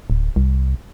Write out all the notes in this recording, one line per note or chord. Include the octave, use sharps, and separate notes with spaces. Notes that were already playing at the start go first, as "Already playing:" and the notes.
D1
C2